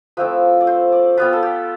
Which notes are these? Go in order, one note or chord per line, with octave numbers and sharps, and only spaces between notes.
F3 A3 C4 E4 B4
D5
C5
D5
G3 B3 F4 B4
A4
G4